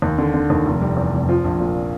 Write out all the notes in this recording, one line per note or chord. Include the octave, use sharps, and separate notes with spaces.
D#2
D3
D3
D#2
F1
G3
E2
F1
F3
A#1
A#2